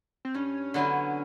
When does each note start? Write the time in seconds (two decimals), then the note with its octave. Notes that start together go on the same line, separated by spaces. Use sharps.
0.25 C4
0.34 G2 C#4
0.74 D3 F#3 B3 E4